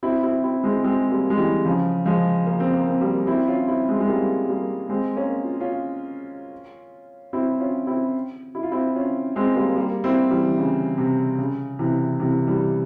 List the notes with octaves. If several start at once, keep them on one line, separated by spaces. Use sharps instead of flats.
C4 E4
C4 E4
C4 E4
G#3 C4
G#3 C4
G3 A#3
G#3
E3 G3
C#3 F3
F3 G#3
A#3
C4
A#3
C4
G3 A#3
C4 E4
C#4 F4
C4 E4
G#3 C4
G#3
G3 A#3
G3 A#3
G#3 C4
A#3 C#4
F4
C#4 F4
C4 E4
C#4 F4
C4 E4
E4
F4
C4 E4
C#4 F4
G#3 C4
G3 A#3
G3 A#3
C4 E4
E3 G3
E3
C#3
C3
C#3
C3 E3
C3 E3
E3 G3